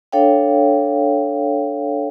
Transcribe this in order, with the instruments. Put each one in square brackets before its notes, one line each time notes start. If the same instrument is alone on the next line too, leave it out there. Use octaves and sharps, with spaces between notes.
[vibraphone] D4 A4 C#5 F5 G5